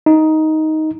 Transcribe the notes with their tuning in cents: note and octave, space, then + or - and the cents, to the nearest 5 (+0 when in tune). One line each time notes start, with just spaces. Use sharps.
D#4 +10